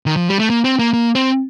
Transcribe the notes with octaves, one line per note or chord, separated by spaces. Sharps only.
D#3
F3
G3
A3
A#3
C4
A#3
A#3
C4